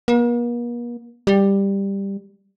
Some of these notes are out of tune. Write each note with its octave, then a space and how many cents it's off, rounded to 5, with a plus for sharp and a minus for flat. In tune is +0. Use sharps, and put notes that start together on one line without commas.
A#3 +45
G3 +10